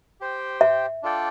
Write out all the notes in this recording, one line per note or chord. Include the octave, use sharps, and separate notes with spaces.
G4 C5 G5
E5
D4 F4 A4 D5 G5